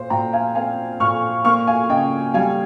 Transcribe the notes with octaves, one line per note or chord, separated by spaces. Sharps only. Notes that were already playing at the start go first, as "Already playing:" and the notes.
Already playing: A#2 C5
A#2 G5 A#5
F5 G#5
C4 F5 G#5
A#2 C#6 F6
A#3 C#6 F6
F5 G#5
C#3 D#5 G5
G3 F5 G#5